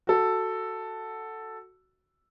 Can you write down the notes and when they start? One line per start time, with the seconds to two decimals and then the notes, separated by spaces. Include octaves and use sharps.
0.07 F#4 A4